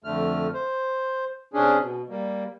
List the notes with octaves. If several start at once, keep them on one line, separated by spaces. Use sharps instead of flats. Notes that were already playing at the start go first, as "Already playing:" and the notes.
F2 D3 A3 F6
C5
C3 C#4 D4 G#4
B2
G3 A#3